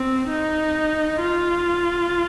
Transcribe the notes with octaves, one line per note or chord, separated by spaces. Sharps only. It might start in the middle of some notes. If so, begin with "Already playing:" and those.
Already playing: C4
D#4
F4